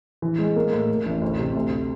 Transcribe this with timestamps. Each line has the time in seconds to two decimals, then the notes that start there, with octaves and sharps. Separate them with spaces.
0.22 E3
0.39 G#3
0.56 A#3
0.73 A2
0.90 A2
1.06 A1
1.22 D2
1.39 C3
1.56 D2